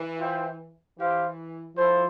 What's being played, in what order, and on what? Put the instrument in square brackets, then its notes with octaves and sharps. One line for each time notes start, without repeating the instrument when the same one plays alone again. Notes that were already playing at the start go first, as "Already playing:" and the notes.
Already playing: [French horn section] E3
[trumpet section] F4 C5 E5 G5
[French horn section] E3 [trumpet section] E4 G4 C5 F5
[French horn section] F3 [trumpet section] E4 A4 C5